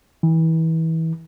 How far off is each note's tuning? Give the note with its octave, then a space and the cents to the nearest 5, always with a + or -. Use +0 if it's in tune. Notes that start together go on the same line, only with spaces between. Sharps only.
E3 -30